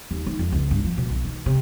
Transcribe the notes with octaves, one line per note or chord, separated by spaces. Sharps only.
D#2
D#3
F2
C#2
G2
F3
B2
B1
D#3
C3